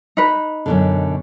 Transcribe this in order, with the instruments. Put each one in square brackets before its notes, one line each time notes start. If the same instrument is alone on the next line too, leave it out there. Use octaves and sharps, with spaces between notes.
[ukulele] D#4 B4
[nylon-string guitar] F#2 B2 D3